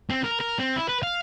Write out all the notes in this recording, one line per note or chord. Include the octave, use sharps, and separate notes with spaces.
C4
A#4
A#4
C4
E4
B4
F5